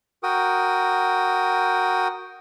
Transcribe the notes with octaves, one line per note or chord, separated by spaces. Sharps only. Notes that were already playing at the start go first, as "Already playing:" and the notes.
F#4 A#4 G5 D#6